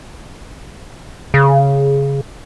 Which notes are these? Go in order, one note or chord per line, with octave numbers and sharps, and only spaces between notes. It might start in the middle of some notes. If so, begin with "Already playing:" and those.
C#3